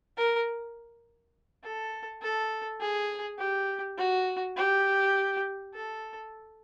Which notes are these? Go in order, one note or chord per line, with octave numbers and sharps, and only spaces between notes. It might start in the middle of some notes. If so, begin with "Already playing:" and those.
A#4
A4
A4
G#4
G4
F#4
G4
A4